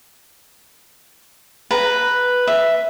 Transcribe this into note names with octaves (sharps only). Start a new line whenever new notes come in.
B4 A#5
E5